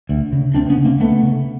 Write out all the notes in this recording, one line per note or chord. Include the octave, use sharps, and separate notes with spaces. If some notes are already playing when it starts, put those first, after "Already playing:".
D2
C#3
D2 C4 D4
B3 C#4
C#3
A#3 C4
D2 A3 B3
C#3